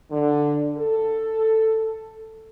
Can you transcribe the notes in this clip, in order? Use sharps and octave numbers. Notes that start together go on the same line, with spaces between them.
D3
A4